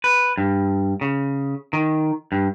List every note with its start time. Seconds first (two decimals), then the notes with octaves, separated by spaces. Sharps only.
0.04 B4
0.38 G2
1.01 C#3
1.73 D#3
2.32 G2